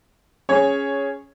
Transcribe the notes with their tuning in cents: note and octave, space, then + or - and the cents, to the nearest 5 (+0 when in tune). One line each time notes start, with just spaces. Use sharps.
C#4 +5 G#4 +0 C#5 +0